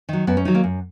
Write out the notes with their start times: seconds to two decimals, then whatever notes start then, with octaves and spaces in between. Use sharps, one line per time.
0.09 D#3 F#3
0.27 F#2 B3
0.37 C#4
0.45 D#3 F#3 D#4
0.55 A#3
0.64 F#2